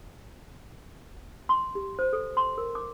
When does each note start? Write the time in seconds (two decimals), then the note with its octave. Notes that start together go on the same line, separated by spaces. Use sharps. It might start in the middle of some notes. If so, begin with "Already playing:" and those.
1.49 C6
1.75 G4
1.99 C5
2.13 A4
2.37 C6
2.58 A#4
2.75 D6